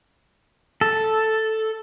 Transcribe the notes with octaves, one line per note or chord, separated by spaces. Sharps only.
A4